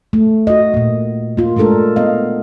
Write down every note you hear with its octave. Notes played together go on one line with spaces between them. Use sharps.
A3
F#4 D#5
A#2 A#3
A#3 F4
G#3 A3 D4 A4 A#4
B3 D#5 F5